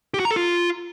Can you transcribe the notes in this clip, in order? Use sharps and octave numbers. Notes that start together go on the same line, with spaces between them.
G4
F#4
A#5
A4
F4